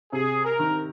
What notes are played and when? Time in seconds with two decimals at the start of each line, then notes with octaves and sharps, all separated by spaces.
0.12 C3 G#4
0.44 A#4
0.59 D#3